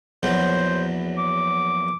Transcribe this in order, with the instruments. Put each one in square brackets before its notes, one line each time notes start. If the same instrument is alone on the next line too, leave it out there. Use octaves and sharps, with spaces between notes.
[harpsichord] A#1 E2 F#3 [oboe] C5
[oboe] D6